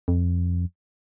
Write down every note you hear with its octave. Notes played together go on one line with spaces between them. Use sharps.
F2